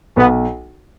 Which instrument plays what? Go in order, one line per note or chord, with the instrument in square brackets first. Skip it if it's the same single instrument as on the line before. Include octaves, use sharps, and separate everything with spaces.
[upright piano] B1 [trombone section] B3